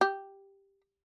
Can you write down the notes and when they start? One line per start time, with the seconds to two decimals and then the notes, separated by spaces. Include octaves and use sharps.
0.01 G4